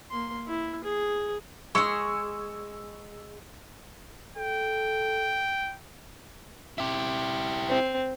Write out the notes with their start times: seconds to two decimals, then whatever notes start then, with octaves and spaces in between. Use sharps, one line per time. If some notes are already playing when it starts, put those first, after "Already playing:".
0.11 A#3 C6
0.47 E4
0.84 G#4
1.75 G#3 G#4 C#6 E6 C#7
4.37 A4 G5
6.78 E4 G4
7.69 C4